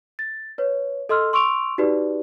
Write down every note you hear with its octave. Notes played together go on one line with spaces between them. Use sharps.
A6
B4 C#5
A4 D#5 C6 E6 F6
C6 C#6 E6 D7 F7
D#4 F#4 G4 B4 D5